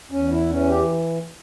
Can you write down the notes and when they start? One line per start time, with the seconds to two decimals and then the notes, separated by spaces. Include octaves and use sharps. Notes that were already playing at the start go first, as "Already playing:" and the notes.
0.11 E2 C#4
0.31 E4
0.49 E3 C#4
0.68 G4